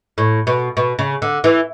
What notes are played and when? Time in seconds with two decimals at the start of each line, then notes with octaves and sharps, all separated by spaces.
0.18 A2
0.47 B2
0.77 B2
0.99 C#3
1.22 D3
1.44 E3